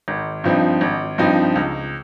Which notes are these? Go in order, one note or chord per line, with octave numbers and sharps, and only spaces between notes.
G#1
G2 F3 C4 D#4
G#1
G2 F3 C4 D#4
C#2